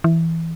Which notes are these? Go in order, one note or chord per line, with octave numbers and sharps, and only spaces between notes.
E3